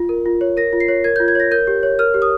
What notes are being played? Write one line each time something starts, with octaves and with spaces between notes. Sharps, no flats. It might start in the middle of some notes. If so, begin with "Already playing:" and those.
Already playing: F4
A#4
F4
C#5
A#4 A#6
F4
C7
C#5
A#4 G#6
G6
F4
G#6
C#5 A#6
A#4 G6
G4
C#5
A#4 F6
G4
D#6